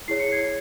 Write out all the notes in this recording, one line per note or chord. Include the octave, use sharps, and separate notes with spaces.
E4 G#4 C#5 C7
C#7
G#6 C7